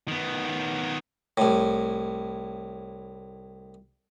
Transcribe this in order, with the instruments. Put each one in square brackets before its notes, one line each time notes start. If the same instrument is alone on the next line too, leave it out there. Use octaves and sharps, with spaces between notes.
[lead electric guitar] D#3 B3
[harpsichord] C2 A2